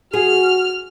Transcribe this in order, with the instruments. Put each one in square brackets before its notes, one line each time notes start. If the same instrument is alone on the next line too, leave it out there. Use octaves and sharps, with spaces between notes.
[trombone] F#4 [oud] G#4 [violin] F6